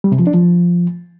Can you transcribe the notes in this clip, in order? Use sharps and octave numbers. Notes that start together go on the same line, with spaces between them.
G3
C3
F3
D4
F3